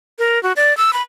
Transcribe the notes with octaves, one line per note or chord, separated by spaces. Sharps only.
A#4
F#4
D5
E6
B5